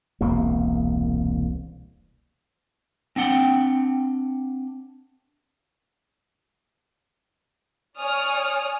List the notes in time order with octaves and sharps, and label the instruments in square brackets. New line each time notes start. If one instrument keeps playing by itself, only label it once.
[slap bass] E1 C2 C3 A#3
[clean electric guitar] C4 D4 F#5 G5
[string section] C#5 D5 G#5 D#6 F6